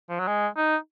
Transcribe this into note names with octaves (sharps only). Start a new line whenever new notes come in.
F3
F#3
G#3
D#4